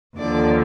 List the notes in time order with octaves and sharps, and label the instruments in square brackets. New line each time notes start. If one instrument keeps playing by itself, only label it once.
[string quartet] D#2 D3 F3 D5